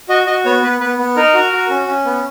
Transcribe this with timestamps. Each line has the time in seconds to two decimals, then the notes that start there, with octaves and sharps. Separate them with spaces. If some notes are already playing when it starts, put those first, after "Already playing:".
0.09 F#4 D#5
0.27 F#4 D#5
0.45 B3 C#5
0.63 B3 B4
0.80 B3 B4
0.98 B3
1.16 D#4 A#4
1.34 F#4
1.53 F#4
1.70 C#4
1.87 C#4
2.05 B3